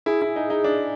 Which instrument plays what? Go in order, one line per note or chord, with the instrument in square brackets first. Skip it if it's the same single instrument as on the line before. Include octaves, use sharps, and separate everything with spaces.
[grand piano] E4 [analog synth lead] G#4
[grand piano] E4
D#4
D#4
D4